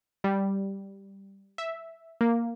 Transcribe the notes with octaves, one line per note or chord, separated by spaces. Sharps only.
G3
E5
A#3